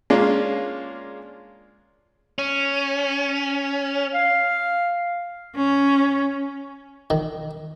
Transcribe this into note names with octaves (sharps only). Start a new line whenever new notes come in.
G#3 A#3 C#4 D4 F4
C#4
F5
C#4
D#3